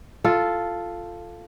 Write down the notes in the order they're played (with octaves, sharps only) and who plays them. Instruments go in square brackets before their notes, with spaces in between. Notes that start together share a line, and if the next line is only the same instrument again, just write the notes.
[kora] F4 A4